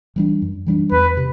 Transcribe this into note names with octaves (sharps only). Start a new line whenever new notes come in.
E3 G3 D4
F#2
E3 G3 D4
E2 B4
C3